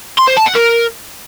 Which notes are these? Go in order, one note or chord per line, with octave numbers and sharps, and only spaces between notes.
C6
C5
A5
F#5
A#4